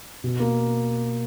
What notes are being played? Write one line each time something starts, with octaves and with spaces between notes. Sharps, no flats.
B2
A#3